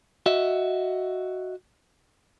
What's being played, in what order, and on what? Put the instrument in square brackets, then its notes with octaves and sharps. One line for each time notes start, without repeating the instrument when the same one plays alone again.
[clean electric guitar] F#4 D#5 E5